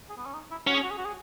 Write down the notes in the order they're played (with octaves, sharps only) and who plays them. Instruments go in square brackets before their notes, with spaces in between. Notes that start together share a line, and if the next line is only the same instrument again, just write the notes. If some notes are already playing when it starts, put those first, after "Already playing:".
[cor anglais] G#4
B3
C#4
D#4
E4
[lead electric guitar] C#4 [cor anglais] F#4
[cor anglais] G#4
F#4
G#4
F#4
G#4